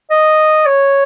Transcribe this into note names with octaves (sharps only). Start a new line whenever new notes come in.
D#5
C#5